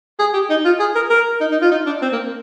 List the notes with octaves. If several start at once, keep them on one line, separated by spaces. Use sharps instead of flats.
G#4
G4
D#4
F4
G#4
A#4
A#4
D#4
D#4
F4
D#4
D4
C4
A#3